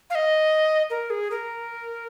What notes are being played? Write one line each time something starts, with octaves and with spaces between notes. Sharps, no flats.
F5
D#5
A#4
G#4
A#4